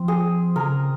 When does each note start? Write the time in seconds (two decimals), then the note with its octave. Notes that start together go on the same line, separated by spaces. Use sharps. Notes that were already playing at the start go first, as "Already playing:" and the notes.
Already playing: F3 C4
0.08 G#4
0.56 C#3 A#4